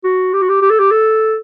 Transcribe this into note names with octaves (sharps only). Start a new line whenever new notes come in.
F#4
G4
F#4
G4
G4
A4
G4
A4